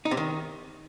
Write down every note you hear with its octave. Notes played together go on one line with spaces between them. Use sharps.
D#4
C3
D#3